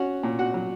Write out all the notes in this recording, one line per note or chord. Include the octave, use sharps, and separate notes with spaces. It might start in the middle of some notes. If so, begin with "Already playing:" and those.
Already playing: C#4 F#4 F#5
A#2
F#4 F#5
F#3